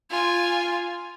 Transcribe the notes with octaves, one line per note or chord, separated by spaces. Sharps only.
F4 G#5